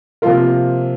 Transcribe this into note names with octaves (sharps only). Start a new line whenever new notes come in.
C3 F3 A#3 F4 A#4